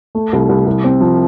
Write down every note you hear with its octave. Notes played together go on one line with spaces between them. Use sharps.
A3
C2
C2
C2
C4
F3